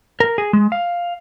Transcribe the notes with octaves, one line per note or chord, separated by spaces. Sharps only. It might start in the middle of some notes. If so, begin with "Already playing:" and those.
A#4
G#4
G#3
F5